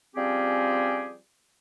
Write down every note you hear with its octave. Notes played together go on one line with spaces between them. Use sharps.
F3 G3 C4 C#4 G4 G#4